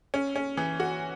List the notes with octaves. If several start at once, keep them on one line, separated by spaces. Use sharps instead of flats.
C#4
C#4
E3
F#4